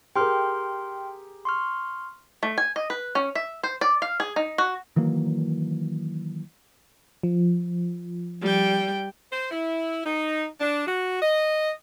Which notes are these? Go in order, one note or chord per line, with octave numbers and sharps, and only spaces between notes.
G4 G#4 A#4 G5 C6 F6
C6 C#6 F6
A3
G#5
D#5
B4
C#4
E5
C5
D5
F5
G#4
D#4
F#4
D#3 E3 F#3 A#3
F3
G3 G5
C5
E4
D#4
D4
F#4
D#5